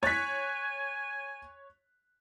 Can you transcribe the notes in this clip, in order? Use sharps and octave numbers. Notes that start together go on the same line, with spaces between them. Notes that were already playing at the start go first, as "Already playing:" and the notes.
C#5 G#5 F#6 A6 B6